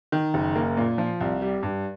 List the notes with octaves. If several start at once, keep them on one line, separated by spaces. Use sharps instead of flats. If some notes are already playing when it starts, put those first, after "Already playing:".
D#3
F#1
A#3
A#2
F3
C2
G3
G2